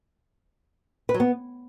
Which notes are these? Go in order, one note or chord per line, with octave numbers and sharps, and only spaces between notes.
B4
F#3
B3